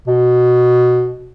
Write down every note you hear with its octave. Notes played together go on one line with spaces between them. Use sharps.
B2